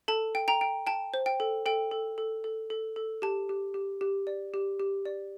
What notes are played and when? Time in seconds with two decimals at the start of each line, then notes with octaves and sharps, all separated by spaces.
0.08 A4 A5
0.35 G5
0.48 G5 A#5
0.61 G5
0.87 G5 A5
1.14 C5
1.26 G5
1.40 A4
1.66 A4 G5
1.91 A4
2.18 A4
2.44 A4
2.70 A4
2.96 A4
3.22 G4 A5
3.49 G4
3.74 G4
4.01 G4
4.27 D5
4.54 G4
4.80 G4
5.05 D5